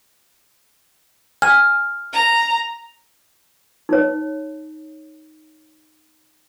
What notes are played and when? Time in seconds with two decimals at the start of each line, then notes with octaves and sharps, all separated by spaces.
1.42 G#5 F6
2.13 A#5
3.89 D#4 C#5